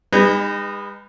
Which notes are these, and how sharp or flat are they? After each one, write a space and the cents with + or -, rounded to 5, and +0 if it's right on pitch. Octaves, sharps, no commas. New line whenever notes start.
G#3 -45 D#4 -20 B4 +0